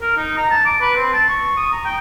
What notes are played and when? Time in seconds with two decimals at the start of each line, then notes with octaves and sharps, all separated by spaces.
0.02 A#4
0.17 D#4
0.37 A#5
0.51 A5
0.66 D6
0.81 B4
0.96 C4
1.13 A5
1.29 C#6
1.57 D#6
1.72 A#5
1.85 G5